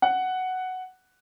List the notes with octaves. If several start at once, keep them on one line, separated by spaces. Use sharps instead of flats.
F#5